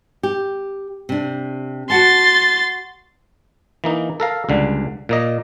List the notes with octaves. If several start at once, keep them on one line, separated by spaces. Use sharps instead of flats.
G4
C3 D4
F#4 F#5 A5 C6 A6
E3 A#3 D#4
A4 A#4 F5
C#2 D3 G3
A#2 A#3 D#5